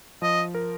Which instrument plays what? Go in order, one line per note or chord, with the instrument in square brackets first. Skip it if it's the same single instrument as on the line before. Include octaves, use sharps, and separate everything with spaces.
[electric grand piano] F3 [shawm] D#5
[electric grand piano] A#4